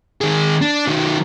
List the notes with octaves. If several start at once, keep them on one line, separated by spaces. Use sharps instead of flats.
D#3 G#4
D4
D#3 F#3